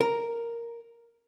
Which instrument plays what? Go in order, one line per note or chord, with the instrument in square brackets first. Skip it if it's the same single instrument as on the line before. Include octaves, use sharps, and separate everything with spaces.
[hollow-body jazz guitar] A#4